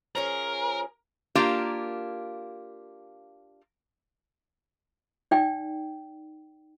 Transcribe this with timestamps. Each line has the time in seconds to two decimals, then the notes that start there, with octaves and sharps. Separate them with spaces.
0.15 F3 C#4 G#4 A#4
1.35 A#3 D4 F4 G4 A#4 F5
5.31 D#4 D5 G5